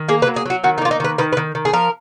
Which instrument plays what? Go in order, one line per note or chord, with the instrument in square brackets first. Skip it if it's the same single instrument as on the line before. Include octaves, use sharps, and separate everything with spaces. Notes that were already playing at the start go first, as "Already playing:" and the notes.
Already playing: [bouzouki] D#3
A#3 G#4
B4
F#3
G#4
F#3 F#4
D#3 F#4
D#4
A#3 F4
D#4
D#3 B4
D#3 B4
B4
D#3
D#3
G#4
F3 A#4